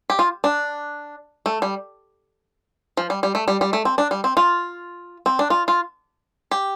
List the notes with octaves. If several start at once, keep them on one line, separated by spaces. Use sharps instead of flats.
G4
F4
D4
A3
G3
F3
G3
G3
A3
G3
G3
A3
C4
D4
G3
C4
F4
C4
D4
F4
F4
G4